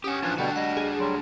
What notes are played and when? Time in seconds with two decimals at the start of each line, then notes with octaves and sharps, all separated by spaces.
0.04 C#4 G4 F#5 D#6
0.22 E3 F3 D4 F4 F#6 G#6 A6
0.38 B2 D3 G3 D4 F#4 G5
0.56 G3 D#5 F#5
0.77 G#4
0.99 F#3 G3 C6